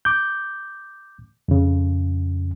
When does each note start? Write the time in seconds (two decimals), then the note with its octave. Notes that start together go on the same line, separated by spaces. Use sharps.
0.05 D6 G6
1.48 F2 C#3